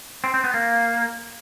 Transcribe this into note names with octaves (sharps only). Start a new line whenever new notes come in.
C4
C4
B3
A#3